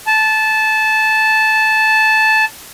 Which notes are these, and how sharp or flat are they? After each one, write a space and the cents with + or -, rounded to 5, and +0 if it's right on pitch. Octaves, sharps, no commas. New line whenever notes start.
A5 -15